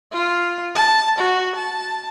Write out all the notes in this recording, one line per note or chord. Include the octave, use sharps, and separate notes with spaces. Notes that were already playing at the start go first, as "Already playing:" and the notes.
F4
A5
F#4
A5